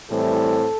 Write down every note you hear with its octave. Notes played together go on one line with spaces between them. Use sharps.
A2 E3 G3 C4 A4